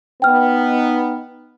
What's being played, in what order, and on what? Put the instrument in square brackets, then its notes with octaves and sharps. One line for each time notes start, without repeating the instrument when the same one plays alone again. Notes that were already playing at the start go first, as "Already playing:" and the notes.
[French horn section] B3 D#4 [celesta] G5 F6